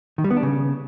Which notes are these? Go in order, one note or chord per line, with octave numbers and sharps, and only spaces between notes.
D#3
G3
B3
D4
C#3